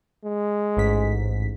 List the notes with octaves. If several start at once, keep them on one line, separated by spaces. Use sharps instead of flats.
G#3
A1 G#2 B6